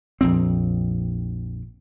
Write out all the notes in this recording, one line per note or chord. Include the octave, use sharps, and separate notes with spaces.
A#1 F2 C4